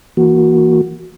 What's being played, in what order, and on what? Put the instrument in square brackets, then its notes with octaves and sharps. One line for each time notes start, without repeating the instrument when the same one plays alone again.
[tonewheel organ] E3 A#3 F#4